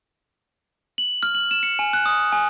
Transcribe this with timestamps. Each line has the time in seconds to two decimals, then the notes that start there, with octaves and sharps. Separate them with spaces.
0.98 F#7
1.23 F6
1.35 F#7
1.51 E7
1.63 C#7
1.79 G#5
1.93 F#6
2.06 D#6
2.32 G#5